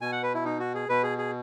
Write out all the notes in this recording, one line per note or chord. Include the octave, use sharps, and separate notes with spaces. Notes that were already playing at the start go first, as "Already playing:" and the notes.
B2 G#5
F#5
B4
E4
D#4
F#4
G#4
B2 B4
G#4
G#4